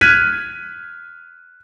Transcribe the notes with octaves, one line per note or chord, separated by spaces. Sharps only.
F6 F#6 G#6 B6 D#7